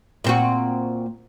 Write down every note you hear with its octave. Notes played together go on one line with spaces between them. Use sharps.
A#2 C4 F#4